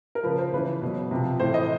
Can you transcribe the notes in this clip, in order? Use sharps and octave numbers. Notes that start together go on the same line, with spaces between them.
A#4
C#3 F3 B4
C5
C#3 E3 B4
B2 F#3
C3 F3
A2 E3 C5
D#5